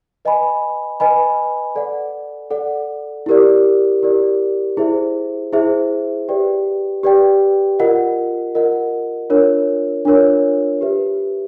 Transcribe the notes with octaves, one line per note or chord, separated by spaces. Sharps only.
B4 D#5 G#5 B5
B4 D#5 G#5 B5
A4 D5 F#5
A4 D5 F#5
E4 G4 A#4 D5
E4 G4 A#4 D5
E4 G#4 C5 E5
E4 G#4 C5 E5
G4 B4 D5 G5
G4 B4 D5 G5
F4 A#4 D#5 F#5
F4 A#4 D#5 F#5
D4 F4 A#4 C#5
D4 F4 A#4 C#5
G4 B4 E5